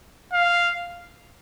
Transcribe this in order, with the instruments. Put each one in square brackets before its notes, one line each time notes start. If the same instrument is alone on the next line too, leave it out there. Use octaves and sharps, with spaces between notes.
[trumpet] F5